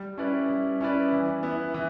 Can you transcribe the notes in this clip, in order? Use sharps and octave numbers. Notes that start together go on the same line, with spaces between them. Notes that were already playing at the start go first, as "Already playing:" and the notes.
Already playing: G3
C#4 E4 B4 D5
G3
C#4 E4 B4 D5
E3
B3 E4
E3